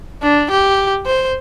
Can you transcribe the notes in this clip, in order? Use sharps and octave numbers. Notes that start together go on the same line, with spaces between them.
D4
G4
C5